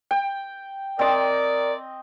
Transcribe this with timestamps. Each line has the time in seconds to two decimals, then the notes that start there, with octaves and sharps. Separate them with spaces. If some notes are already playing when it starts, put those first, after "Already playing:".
0.11 G5
0.99 C4 A#4 D5 D#5